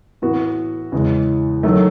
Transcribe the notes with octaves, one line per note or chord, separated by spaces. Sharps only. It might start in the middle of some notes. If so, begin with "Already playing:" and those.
A2 E3 B3 F#4
E2 C#3 E3 G#3
D#3 F#3 A3